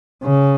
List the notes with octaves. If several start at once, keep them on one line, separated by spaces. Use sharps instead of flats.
C#3